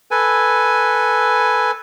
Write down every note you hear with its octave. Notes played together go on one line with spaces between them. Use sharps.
A4 B4 G#5